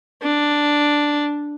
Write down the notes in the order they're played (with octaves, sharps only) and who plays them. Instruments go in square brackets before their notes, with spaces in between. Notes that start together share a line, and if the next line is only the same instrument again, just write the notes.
[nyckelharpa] D4